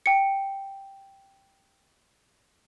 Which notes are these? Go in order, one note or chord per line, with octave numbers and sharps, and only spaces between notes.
G5 C#7